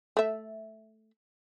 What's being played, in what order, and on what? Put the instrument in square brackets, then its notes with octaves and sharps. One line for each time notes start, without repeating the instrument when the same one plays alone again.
[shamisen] A3 E5